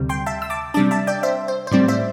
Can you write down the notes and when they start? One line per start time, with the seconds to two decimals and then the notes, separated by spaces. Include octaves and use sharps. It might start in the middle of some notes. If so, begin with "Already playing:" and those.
Already playing: D2 C3 G3
0.09 G5 C6
0.26 E5 A5
0.42 E6
0.50 A5 D6
0.74 C3 G3 D4 A5 D6
0.91 E5 A5
1.07 D5 G5
1.23 C5 E5
1.48 C5
1.67 C5
1.71 A2 G3 C4 D5
1.88 C5 E5